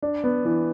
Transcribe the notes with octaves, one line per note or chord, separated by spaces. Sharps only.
D4
B3
E3